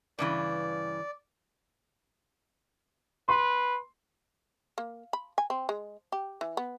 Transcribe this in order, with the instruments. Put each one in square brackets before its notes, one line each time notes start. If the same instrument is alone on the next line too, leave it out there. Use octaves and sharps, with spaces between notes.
[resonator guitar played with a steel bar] G2 C#3 E3 [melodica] D5
[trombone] B4 [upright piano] C6
[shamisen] A#3
B5
G#5
C4
G#3
G4
E3
B3